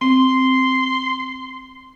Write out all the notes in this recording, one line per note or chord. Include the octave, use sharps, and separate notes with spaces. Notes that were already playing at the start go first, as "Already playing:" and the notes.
C4 C6